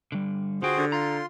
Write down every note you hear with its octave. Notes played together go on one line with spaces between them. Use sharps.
D3 G3
D3 F4 F#4 G#4 C5 G5
D3 G4
F4 A#5 C6